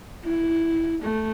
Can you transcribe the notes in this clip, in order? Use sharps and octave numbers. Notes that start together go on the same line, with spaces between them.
E4
A3